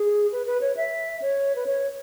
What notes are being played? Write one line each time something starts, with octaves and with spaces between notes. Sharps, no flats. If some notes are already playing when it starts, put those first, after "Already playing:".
Already playing: G#4
B4
B4
C#5
E5
C#5
B4
C#5